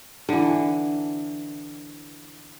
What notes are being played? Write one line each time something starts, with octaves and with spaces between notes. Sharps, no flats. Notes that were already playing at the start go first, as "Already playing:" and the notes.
D3 E3